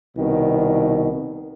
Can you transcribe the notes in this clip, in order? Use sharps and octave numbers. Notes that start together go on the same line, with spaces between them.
C2 B2 D#3